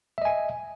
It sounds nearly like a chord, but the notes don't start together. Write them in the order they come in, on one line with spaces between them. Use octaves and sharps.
E5 D#5 G#5